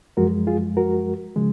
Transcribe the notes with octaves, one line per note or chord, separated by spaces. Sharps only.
F#2 F3 G#3 F#4 A#4
F4 G#4
F#4 A#4
C#3 F3 G#3